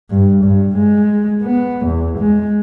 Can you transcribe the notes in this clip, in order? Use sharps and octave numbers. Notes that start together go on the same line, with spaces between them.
G2
G2
G#3
B3
E2
G#3